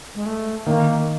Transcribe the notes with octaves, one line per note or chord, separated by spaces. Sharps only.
G#3
A3
D#3 A#3